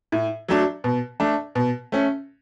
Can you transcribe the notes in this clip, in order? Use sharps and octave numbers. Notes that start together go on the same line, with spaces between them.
A2
F#3 A3 D4
B2
A3 D4
B2
A3 C#4